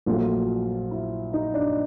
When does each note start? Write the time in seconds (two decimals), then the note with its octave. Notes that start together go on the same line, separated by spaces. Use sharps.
0.06 A#1 A#2 F#3 A3 F4
0.91 E4
1.33 D#4
1.54 D4